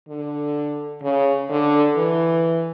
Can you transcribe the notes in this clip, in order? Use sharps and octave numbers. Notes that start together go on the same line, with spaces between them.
D3
C#3
D3
E3